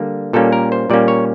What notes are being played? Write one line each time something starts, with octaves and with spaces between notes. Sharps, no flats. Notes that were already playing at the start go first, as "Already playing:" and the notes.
Already playing: D3 G3 A#3
A#2 G3 A#3 C#4 A4
A#4
C5
A#2 G3 A#3 C#4 D5
C#5